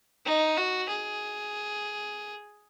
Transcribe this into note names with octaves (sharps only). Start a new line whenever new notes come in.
D#4
F#4
G#4